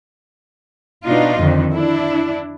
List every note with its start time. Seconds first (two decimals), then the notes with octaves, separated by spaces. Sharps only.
1.04 B2 B3 D4 D#4 F4
1.39 F2 D3 D#3
1.72 D4 E4